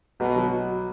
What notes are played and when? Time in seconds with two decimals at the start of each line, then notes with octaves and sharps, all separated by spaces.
0.20 B1 B2
0.36 F#3